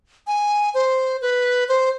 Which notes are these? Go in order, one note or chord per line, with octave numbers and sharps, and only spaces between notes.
G#5
C5
B4
C5